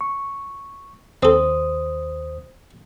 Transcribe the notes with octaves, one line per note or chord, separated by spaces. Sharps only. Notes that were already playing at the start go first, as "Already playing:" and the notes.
C#6
D#2 C4 A4 C5 D#6